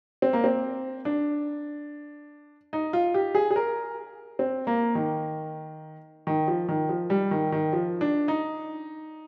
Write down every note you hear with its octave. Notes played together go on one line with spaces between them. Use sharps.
C4
A#3
C4
D4
D#4
F4
G4
G#4
G#4
A#4
C4
A#3
D#3
D#3
F3
D#3
F3
G3
D#3
D#3
F3
D4
D#4